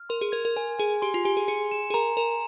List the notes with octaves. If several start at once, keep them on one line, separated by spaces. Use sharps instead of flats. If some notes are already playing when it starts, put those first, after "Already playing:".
Already playing: F6
A#4 C6
G#4
A#4 G#6
A#4
A#4 G#5
G#4 G#5
G4 C6
F4
G4 G#5
G#4
G#4 C#7
E7
G#4
A#4 A#5
A#4 E7